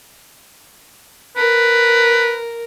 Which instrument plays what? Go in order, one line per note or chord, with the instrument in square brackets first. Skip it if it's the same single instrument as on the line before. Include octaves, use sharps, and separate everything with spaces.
[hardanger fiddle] A#4 [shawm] B4